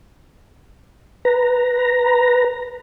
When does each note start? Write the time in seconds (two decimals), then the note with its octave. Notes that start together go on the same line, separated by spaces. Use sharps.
1.25 B4 A#5